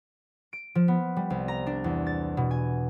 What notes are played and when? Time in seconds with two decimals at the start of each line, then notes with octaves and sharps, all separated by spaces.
0.53 D7
0.75 F3
0.88 B3
1.16 G3
1.30 C2
1.48 A#5
1.67 D4
1.84 E2
2.07 A6
2.37 B2
2.51 G#5